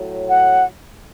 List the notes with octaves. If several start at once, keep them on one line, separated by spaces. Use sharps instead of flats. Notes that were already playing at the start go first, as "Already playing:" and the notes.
Already playing: A2 F#3
F#5